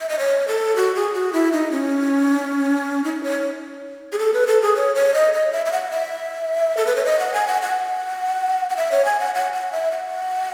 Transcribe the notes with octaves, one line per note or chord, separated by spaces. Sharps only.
E5
D#5
C#5
A4
F#4
G#4
F#4
E4
D#4
C#4
D#4
C#5
G#4
A4
B4
A4
G#4
C#5
C#5
D#5
D#5
E5
E5
F#5
E5
A4
B4
C#5
D#5
F#5
G#5
F#5
F#5
F#5
E5
C#5
G#5
F#5
F#5
F#5
E5
F#5